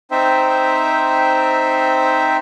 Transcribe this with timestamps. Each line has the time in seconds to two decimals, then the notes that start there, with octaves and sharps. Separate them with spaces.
0.11 C4 D#4 C5 E5 G5